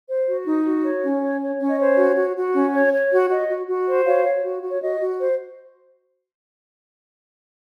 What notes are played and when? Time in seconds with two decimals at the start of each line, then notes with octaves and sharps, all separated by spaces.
0.09 C5
0.27 F#4
0.46 D#4
0.65 F#4
0.84 C#5
1.03 C#4
1.22 C#5
1.41 C#5
1.60 C#4
1.69 D#5
1.79 C5 C#5
1.97 F#4
2.16 F#4
2.35 F#4
2.55 C#4
2.74 C#5
2.92 C#5
3.12 F#4
3.30 F#4 D#5
3.49 F#4
3.68 F#4
3.87 C5
4.06 F#4 C#5 F5
4.25 C#5
4.43 F#4
4.63 F#4
4.69 C#5
4.81 F#4 D#5
5.01 F#4
5.20 C5